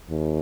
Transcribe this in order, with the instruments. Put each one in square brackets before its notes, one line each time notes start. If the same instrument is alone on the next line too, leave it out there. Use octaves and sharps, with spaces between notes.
[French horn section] D#2